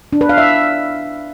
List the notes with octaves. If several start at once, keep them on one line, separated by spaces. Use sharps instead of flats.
D4
B4
F5
E5